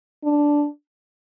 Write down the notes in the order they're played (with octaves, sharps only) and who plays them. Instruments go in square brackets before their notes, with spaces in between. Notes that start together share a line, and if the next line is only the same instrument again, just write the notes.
[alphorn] D4